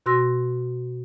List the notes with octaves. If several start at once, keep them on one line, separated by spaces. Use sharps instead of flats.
B2 F#4 C6 E6 A#6